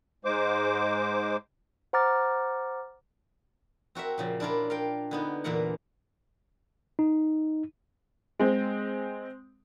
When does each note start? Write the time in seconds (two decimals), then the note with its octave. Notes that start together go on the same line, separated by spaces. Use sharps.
0.25 G#2 G#3 C5 D6
1.93 C5 F#5 A#5 D6 F6 A6
3.95 C4 F#4 A#4 E5
4.18 A#2 C#3 F3
4.40 D4 E4 F4 A#4
4.70 A#4 F5 G5
5.11 D3 B3 D#4
5.44 E2 A#2 D3 E3 A#4 F#5
6.99 D#4
8.39 G#3 C4